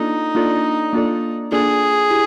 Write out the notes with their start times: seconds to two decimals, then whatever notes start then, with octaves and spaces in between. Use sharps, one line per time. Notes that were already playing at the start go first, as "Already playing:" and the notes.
Already playing: A#3 D4 D#4 F4 A4 D5
0.35 A#3 D4 F4 A4 D5
0.93 A#3 D4 F4 A4 D5
1.51 A#3 D4 F4 G#4 A4 D5
2.10 E4 G4